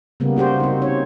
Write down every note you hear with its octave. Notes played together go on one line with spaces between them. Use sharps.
C#3 G3 A#3 B3
A#3 F#4 G4 C5
C4 D#4
C#5